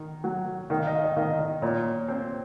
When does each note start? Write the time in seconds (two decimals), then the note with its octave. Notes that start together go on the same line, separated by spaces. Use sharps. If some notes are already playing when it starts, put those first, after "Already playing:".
Already playing: D#3
0.24 F#3
0.70 D#3 D#5
0.79 F5
0.87 D#5
0.95 F5
1.04 D#5
1.13 F5
1.17 D#3
1.22 D#5
1.30 F5
1.39 D#5
1.62 A#2 C#5
2.08 C4 C5